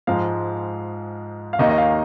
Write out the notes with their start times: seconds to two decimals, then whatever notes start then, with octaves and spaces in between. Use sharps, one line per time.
0.07 G#2 F3 G#3 F5
1.53 F5
1.59 D#2 D#3 A#3 D#4 D#5
1.69 D#5
1.78 F5